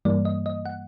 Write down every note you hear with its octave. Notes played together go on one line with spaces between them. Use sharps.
G2 E3 G3 A#3 D5
D#5
D#5
F#5